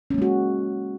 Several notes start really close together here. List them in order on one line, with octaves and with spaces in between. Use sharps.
C#4 A#3 G#3 F#4